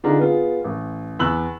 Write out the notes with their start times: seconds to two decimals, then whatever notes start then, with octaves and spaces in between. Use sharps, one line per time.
0.04 D3 D4 D#4 F4 G#4 A#5
0.19 B3 F4 G#4
0.65 A1
1.19 E2 B5 E6 F#6 F#7